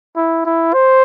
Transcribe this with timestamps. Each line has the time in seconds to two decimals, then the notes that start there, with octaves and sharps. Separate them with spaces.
0.16 E4
0.45 E4
0.74 C5